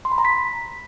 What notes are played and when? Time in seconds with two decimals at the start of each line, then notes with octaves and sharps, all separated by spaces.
0.05 C6
0.12 B5
0.18 A#5
0.25 B6